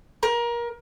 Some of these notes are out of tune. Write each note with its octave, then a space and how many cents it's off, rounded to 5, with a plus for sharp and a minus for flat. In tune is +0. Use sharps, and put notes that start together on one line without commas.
A#4 +25